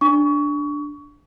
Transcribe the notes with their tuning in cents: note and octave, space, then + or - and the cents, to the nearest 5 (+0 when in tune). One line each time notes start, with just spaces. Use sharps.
D4 +0 C#6 +25